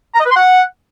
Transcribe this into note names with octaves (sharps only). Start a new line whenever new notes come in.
A#5
D#5
B4
C6
F#5